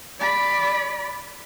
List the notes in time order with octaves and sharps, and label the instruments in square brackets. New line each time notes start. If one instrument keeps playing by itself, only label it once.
[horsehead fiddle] D5 B5